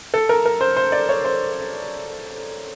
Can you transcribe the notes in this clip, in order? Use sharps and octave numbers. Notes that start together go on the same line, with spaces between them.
A4
A#4
A#4
C5
C5
D5
C#5
C5